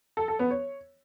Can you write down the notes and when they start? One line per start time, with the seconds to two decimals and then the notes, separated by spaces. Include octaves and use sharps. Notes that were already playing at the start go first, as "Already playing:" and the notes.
0.17 A4
0.28 A4
0.39 B3
0.51 C#5